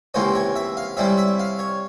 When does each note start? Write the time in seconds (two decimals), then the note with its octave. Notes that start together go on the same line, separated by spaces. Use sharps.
0.14 C#2 C3 E3 A#3 C#4 C5
0.35 C#5
0.56 E5
0.77 F5
0.97 C3 G3 C#4 E4 E5
1.18 E5
1.39 F5
1.59 C#5